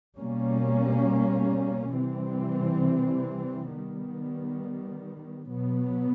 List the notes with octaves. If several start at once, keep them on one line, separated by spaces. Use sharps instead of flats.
B2 G3 A#3 C#4
C3 E3 G3 C4
D#3 G3 B3
B2 F#3 B3